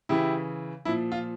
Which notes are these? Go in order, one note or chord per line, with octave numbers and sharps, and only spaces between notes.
C#3 E3 E4 G4
A#2 F3 E4
F4